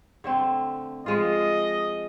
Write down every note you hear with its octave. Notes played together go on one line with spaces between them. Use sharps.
D3 A3 C4
F3 G#3 F4 D#5